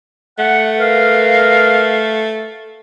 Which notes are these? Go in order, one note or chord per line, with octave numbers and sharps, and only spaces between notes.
A3 F#5
A#4 B4 F5